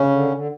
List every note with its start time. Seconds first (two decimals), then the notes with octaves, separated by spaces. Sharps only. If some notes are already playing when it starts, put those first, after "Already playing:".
Already playing: C#3 C#4
0.10 D3
0.32 D3